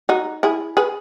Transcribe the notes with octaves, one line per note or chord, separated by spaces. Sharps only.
D#4 F#4
E4 G#4
G#4 B4